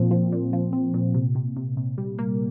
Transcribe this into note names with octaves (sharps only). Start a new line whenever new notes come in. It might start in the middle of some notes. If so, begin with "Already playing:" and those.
Already playing: A#2 F3 C4
F3
A#2
F3
C4
A#2
C3
C3
C3
C3
G3
A#3